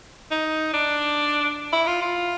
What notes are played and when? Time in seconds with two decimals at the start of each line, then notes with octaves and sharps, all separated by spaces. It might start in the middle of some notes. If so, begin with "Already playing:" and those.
0.31 D#4
0.73 D4
1.73 E4
1.87 F4
2.02 F4